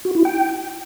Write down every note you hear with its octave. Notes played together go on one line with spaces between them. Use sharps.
F#4
E4
G5